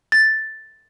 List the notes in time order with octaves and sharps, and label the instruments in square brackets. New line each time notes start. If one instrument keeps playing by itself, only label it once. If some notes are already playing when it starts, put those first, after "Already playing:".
[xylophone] A6